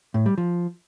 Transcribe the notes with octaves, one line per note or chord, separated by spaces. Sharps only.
A2
G3
F3